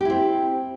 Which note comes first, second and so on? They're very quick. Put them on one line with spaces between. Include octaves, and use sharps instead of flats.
G4 E4 C4